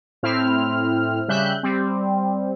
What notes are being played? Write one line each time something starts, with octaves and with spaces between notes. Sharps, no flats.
A2 C4 E4 F6
C#3 G3 E5 F#6 G6
G3 C4